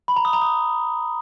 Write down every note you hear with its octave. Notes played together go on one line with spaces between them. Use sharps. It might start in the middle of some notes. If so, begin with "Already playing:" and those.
B5
A#5
D#6
A#5
D#6